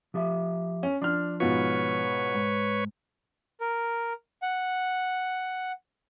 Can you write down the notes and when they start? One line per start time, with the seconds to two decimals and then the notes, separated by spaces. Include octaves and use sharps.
0.14 F3 G4 E5
0.83 C#4
1.02 F3 D4 F6
1.40 G#2 B2 F4 B4 C#5 C#6
2.34 G#2
3.61 A#4
4.42 F#5